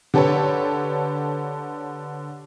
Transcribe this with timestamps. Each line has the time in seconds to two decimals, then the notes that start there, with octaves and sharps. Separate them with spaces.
0.14 D3 G4 A4 B4 C#5